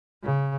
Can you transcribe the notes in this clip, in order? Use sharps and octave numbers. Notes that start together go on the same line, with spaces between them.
C#3